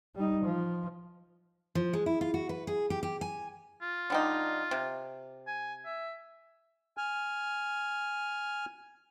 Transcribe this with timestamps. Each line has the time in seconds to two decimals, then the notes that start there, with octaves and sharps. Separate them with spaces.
0.15 G3 D#4
0.44 F3
1.75 F3
1.93 G#3
2.06 E4
2.21 F4
2.34 F#4
2.49 B4
2.67 G#4
2.90 G4
3.03 G4
3.21 G#5
3.82 F4
4.10 D3 G3 D#4
4.71 C3
5.47 G#5
5.85 E5
6.97 G#5 F6